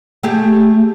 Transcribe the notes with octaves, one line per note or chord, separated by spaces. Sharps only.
A3 G4 G#4